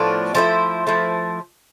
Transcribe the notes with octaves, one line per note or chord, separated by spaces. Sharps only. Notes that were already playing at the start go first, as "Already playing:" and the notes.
Already playing: A2 F3 B3 D4 C5
F3 A3 E4 C5
F3 A3 E4